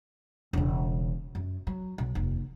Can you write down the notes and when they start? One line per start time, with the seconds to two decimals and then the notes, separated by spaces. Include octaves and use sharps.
0.53 E1 C#3
1.35 F#2
1.67 F#3
1.98 B1
2.15 F1 D#2